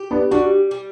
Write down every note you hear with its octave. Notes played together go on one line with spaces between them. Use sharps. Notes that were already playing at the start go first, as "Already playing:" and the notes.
Already playing: G4
B3 D4
G3 D4 F#4
G3